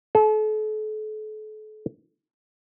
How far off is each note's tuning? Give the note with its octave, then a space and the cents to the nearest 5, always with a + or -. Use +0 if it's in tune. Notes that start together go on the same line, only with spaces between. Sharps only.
A4 -40